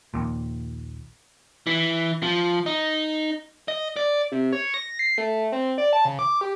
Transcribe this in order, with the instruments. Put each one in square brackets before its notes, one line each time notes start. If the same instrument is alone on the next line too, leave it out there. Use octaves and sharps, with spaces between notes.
[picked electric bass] A#1 D#2 A#2
[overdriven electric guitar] E3
F3
D#4
D#5
D5
[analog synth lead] C3
C#5
A#6
C7
A3
C4
D5
A5
C#3
D6
G4